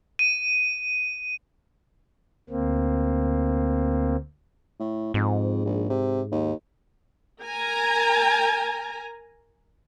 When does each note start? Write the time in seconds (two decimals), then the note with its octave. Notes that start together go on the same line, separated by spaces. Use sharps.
0.19 D#7
2.50 D2 A#3 C4
4.80 A2
5.14 F2 G#2
5.65 A#1
5.89 C3
6.32 D#2
7.44 A#4 G#5 A#5